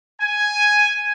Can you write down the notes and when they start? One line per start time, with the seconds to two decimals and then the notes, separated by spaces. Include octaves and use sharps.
0.21 G#5